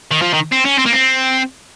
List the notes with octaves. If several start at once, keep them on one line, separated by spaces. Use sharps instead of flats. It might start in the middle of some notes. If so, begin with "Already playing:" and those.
D#3
F3
D#3
C4
C#4
C4
A#3
C4